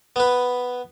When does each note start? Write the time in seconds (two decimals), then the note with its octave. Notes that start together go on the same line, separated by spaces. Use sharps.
0.16 B3 B4